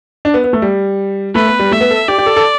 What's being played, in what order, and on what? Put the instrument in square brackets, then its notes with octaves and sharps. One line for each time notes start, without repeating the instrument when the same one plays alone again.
[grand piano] D4
B3
B3
A3
G3
[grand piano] A3 [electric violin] B4
[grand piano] B3
G3
[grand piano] A3 [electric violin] E5
[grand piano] B3
A4
[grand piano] G4 [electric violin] D5
[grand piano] G4
A4
A4